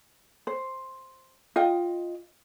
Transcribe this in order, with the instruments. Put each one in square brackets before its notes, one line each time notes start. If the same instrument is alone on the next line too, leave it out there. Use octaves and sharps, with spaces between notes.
[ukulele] C5
F4 D#5 G5